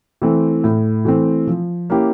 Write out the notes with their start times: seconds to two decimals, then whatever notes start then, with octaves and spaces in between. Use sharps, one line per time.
0.22 E3 A3 C4
0.64 A2
1.05 E3 A3 C4
1.47 F3
1.90 A#3 C#4 E4 G4